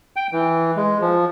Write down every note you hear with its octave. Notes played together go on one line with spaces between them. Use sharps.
G5
E3
G#3
F3